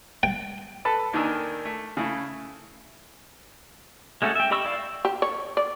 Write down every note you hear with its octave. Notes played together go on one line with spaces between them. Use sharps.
G5
A4 B4 A5 E6
D#2 D#3 D4 A#4 G#5 E6
A3
C#3 A3 E4
G#3 A3 C#4 F#4 A4
E5 G5
G4 D#5 B5 C#6 E6
E4 D5 F5
G4
C#5
D5